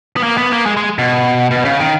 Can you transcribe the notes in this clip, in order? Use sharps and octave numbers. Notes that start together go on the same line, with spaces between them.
B3
A#3
B3
A#3
G#3
G#3
B2
B2
C#3
D#3